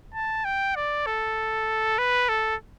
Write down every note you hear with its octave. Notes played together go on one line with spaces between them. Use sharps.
A5
G5
D5
A4
B4
A4